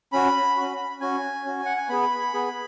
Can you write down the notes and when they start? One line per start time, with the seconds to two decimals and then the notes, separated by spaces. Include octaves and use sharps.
0.13 C#4 F#4 B5
0.57 C#4 F#4
1.01 C#4 F#4 G#5
1.45 C#4 F#4
1.66 F#5
1.77 G#5
1.89 B3 G#4 B5
2.34 B3 G#4